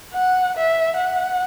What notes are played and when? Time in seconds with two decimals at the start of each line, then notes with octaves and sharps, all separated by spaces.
0.13 F#5
0.56 E5
0.97 F#5